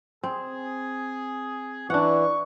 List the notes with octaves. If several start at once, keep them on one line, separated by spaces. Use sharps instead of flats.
C4 G#4
E3 D4 F#5 C#6